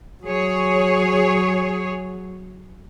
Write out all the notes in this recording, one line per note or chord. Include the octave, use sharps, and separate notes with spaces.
F#3 G#4 C#5